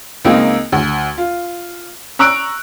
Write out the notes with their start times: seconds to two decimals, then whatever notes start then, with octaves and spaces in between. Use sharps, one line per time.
0.25 C#2 A#3 C4 D#4
0.72 D2
1.18 F4
2.19 A#5 C#6 E6 F#6 D7